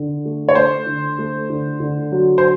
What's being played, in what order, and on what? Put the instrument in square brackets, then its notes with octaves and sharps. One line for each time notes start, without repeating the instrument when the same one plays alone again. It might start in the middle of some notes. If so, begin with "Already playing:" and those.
Already playing: [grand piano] D3
A3
[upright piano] C#5
[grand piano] A3 [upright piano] C5
[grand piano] D3
A3
D3
D3
F#3
[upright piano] C5